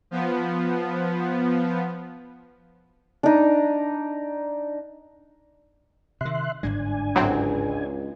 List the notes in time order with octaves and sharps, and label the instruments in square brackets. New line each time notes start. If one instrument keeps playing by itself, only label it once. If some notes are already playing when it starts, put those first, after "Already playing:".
[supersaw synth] F3 B3
[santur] D4 D#4
[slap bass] C3 D#3 [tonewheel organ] E5 C6 F#6
[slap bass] G1 G#2 G#3 [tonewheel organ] D4 G#5
[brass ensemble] C#2 [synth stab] A2 F#3 C4